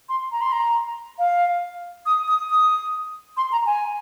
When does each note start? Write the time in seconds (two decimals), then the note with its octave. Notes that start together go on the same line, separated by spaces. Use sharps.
0.09 C6
0.32 A#5
0.41 C6
0.52 A#5
1.19 F5
2.06 D#6
2.28 D#6
2.50 D#6
3.37 C6
3.52 A#5
3.66 G#5